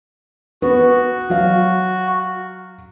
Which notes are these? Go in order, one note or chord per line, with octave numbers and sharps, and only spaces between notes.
B3 F#4
F#3 F5